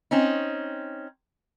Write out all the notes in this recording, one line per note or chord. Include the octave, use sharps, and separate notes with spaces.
C4 C#4 D#4